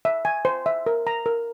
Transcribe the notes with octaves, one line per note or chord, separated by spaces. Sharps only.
E5
G#5
C5
E5
A#4
A#5
A#4